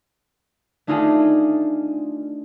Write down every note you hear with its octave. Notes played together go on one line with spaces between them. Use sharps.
A3 D4 D#4 F4 G#4 A4